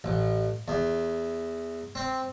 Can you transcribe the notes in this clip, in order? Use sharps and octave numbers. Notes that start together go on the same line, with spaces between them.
A1
E2
C4